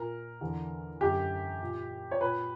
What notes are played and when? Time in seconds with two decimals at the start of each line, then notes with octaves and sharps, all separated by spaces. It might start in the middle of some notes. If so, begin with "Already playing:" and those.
Already playing: A#2 A#4
0.41 E2 D3
1.01 F#2 D3 G4
1.61 A#2
2.11 C#5
2.21 A#2 B4